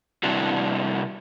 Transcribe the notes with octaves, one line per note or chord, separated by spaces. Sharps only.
C3 G3 C4 D4 E4 F#4